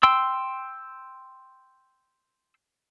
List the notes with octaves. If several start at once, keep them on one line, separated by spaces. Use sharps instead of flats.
G5 C6 E6